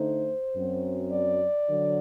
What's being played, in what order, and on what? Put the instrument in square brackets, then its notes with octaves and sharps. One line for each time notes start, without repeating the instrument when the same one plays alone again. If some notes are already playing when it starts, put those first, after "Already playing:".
Already playing: [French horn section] D3 A3 D#4 C5
F#2 F#3 C4
D5
D3 F#3